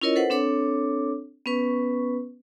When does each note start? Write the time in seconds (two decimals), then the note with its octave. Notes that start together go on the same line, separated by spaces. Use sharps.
0.02 C#4 E4 F4 A#4 C#5 D#5
0.16 A4 B4 C5 F#5
0.30 C4 D4 A4 C#5 D6
1.46 B3 C#4 B4 C#6